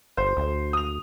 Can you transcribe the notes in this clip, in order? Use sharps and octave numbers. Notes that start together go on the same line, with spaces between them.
G1 C5
D2
D#6 F7